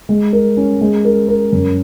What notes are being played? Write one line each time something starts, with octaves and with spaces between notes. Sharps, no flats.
G#3
A#4
C#4
G#3
A#4
A#4
F#2